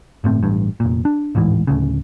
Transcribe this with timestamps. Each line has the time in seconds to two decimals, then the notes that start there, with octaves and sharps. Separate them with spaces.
0.24 G1 A2 C4
0.43 A1 G2
0.80 F1 A#2
1.05 D4
1.35 D1 A1 G#2 E3
1.67 D1 D2 C#3